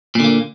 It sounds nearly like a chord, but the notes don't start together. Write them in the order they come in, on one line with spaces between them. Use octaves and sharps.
A#2 D3 A#3